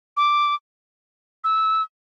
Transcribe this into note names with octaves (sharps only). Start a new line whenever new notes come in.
D6
E6